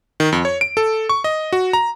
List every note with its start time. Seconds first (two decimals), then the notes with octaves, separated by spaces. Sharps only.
0.20 D#3
0.32 F2
0.45 C#5
0.61 D7
0.77 A4
1.09 C#6
1.24 D#5
1.53 F#4
1.73 A#5